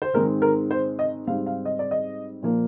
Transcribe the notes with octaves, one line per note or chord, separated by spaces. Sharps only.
C5
G#2 D#3 G#3 C4 A#4
A#4
C5
D#5
G#2 G3 C4 F5
F5
D#5
D5
D#5
A#2 F3 A#3